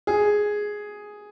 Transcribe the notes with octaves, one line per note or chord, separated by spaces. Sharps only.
G#4